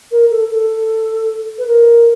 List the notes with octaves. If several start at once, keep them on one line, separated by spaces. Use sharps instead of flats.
A#4
A4
A4
B4
A#4